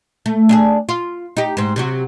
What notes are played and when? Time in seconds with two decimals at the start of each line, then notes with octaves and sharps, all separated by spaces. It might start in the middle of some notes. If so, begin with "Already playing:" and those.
0.26 A3
0.49 D4 G4 G#4
0.89 F4
1.37 D#4 G4
1.57 G#2 C4
1.76 C3 F#3 F#4